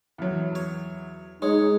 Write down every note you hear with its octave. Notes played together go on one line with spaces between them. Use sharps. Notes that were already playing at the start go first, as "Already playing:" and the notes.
E2 F#3
C#5
G#3 D#4 C#5